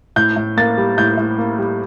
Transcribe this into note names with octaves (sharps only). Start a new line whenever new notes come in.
A2 G6
A2
A#3 A6
G3
A2 G6
A2
A#3
G3